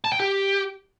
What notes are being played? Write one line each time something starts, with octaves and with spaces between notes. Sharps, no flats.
A5
G5
G4